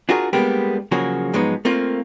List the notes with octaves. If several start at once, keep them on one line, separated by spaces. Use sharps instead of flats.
D4 F4 F#4 G#4 A#4
G3 G#3 A#3 B3 D4 G4
C#3 F3 F#3 A#3 F#4 G#4
G#2 F3 F#3 G#3 B3 D#4
A3 A#3 C4 F4